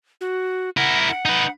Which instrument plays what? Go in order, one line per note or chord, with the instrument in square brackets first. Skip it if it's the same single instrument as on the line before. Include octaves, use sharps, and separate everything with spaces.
[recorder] F#4
[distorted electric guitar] E4 A#4 [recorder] F#5
[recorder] F#5
[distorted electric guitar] D#4 B4